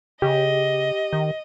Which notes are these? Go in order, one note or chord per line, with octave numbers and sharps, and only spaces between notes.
C#3 G4 D#5
D#3